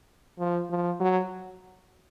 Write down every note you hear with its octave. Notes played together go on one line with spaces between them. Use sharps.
F3
F3
F#3